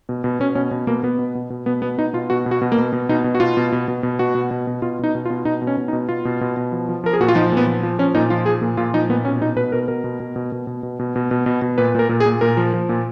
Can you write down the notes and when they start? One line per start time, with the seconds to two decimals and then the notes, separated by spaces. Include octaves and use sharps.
0.09 B2
0.24 B2
0.40 B2 C#4
0.55 B2 C#4
0.71 B2
0.87 B2 A#3
1.03 B2 B3
1.19 B2
1.35 B2
1.50 B2
1.66 B2 B3
1.82 B2 B3
1.98 B2 D#4
2.13 B2 F4
2.30 B2 F#4
2.46 B2
2.51 F#4
2.62 B2
2.72 A#3
2.78 B2
2.93 B2
3.09 B2 D#4
3.24 B2
3.35 F#4
3.40 B2 F4
3.57 B2
3.72 B2
3.88 B2
4.03 B2
4.19 B2 F#4
4.35 B2
4.51 B2
4.67 B2
4.82 B2 F4
4.99 B2 D#4
5.15 B2
5.25 F4
5.30 B2
5.45 B2 D#4
5.62 B2
5.67 C#4
5.77 B2
5.88 D#4
5.93 B2
6.09 B2 F4
6.25 B2
6.41 B2
6.57 B2
6.72 F3
6.89 F3
7.04 F3 A#4
7.13 G#4
7.20 A#2 F#4
7.28 F4
7.35 F3 D#4
7.52 A#2 B3
7.67 F3
7.83 F3
7.99 F3 C#4
8.14 A#2 D#4
8.30 F3 F4
8.46 F3 G#4
8.62 A#2
8.77 A#2 F4
8.94 F3 D#4
9.10 A#2 B3
9.25 B2 C#4
9.41 B2 D#4
9.56 B2 B4
9.72 B2 A#4
9.88 B2 A#4
10.04 B2
10.20 B2
10.36 B2
10.52 B2
10.67 B2
10.83 B2
10.99 B2
11.16 B2
11.31 B2
11.46 B2
11.62 B2
11.78 A#2 B4
11.95 A#2 A#4
12.09 A#2
12.20 G#4
12.26 A#2
12.41 A#2 A#4
12.57 F3
12.74 F3
12.89 A#2